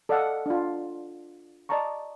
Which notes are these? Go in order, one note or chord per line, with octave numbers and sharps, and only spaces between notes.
A4 D5 D#5 F5 F#5
D4 F4
D5 D#5 A5 A#5 C#6